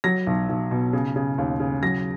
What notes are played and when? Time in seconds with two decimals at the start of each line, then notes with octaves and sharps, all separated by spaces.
0.04 F#3 A#6
0.27 B1
0.49 B1
0.71 B2
0.93 C#3
1.16 C#3
1.38 D#2
1.60 C#3
1.82 F#3 A#6